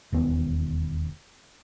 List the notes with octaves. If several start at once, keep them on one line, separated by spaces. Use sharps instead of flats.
E1 D#2 B3